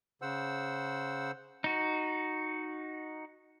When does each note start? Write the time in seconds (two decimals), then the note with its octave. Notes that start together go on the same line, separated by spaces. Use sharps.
0.22 C#3 C5 F#5 E6
1.64 D#4 F#4